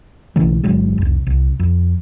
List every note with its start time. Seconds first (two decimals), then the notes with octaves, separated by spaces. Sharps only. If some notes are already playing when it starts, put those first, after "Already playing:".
0.36 B1 C#3 E3 A3
0.63 G1 D3 F#3 G#3
0.98 F1 C2
1.27 C2
1.59 F2